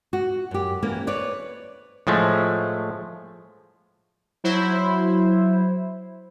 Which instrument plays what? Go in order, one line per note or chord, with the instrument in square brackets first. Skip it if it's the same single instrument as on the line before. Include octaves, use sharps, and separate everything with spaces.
[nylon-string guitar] F#4
F#2 G4
E3 A#3 C#4
B4 C#5 D5
[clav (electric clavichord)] A2 F3 G#3 A3
[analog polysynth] F#3 E4 C5